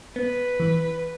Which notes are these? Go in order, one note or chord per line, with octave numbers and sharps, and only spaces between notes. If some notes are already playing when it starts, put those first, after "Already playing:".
B3 B4
E3